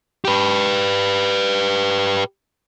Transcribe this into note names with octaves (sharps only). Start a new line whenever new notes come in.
G4 B4